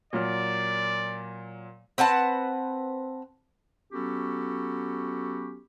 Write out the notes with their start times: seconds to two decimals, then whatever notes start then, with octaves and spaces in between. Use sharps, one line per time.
0.13 A#2 F#3 D5 F6
1.98 C4 B4 F#5 A5
3.92 F#3 B3 C#4 F#4 G4 A4